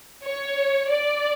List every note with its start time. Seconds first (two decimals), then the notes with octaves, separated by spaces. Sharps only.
0.24 C#5
0.89 D5